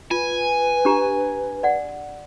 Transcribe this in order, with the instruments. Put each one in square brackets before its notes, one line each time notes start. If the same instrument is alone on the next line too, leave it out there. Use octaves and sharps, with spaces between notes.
[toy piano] F4 [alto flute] B4 [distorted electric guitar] G#5
[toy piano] D4 G4 A#5
D5 F#5